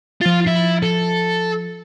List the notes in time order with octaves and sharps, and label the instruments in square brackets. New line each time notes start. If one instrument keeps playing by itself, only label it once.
[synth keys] F3 A6 [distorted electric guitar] F4
[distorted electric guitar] E4
A4